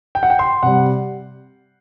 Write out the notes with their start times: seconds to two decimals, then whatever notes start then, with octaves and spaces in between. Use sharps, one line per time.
0.15 G5
0.23 F#5
0.30 G5
0.39 C6
0.63 C3 G3 F#5